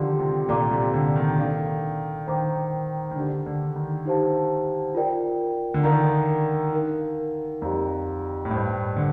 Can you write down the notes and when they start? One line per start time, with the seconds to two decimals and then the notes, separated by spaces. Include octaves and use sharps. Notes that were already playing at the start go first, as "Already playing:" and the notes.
Already playing: D3 D#3 F3 G4 D5 F5 C6
0.19 C3
0.49 A#2 A4 D5 F5 A#5 D6
0.71 C3
0.94 D3
1.16 D#3
1.38 D4 A4 D5 F5
2.27 D#3 C5 G5 A#5 D6
3.11 D#3
3.16 D3 D4 G4 D5
3.46 D3
3.76 D#3
4.05 D#4 G4 C5 F5 A5
4.95 F4 A#4 D5 G5
5.74 D3
5.84 D#3 D#4 A#4 D5 F5 A#5
6.73 D#4 A#4 F5
7.62 F2 D#4 G4 D5 F5 A#5
8.45 A2
8.51 G2 G4 C5 D#5
8.97 D3